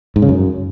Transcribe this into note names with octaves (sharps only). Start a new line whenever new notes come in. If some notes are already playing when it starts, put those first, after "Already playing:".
G#2
C#3
F#2